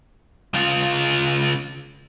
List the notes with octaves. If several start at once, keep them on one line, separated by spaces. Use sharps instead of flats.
C#3 F4